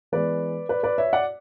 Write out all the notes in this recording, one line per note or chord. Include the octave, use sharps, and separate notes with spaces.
E3 G#3 B3 B4 D5
B4 D5
B4 D5
C#5 E5
D5 F#5